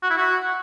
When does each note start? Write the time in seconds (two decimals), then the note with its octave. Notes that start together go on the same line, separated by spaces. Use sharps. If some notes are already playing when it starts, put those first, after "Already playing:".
0.03 F#4
0.10 E4
0.17 F#4